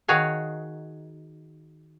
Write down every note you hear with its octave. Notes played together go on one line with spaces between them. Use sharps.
D#3 F#4 G#4 C#5 F5